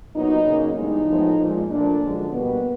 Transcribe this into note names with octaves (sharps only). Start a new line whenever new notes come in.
A#2 F#3 B3 D#4
C#3 F#3 A#3
G2 E3 G#3 B3 D#4
A2 F3 G#3 B3
A#2 F3 G#3
A#2 F3 A3 D4
F#2 D3 F3 G#3
B2 G3 A#3 B3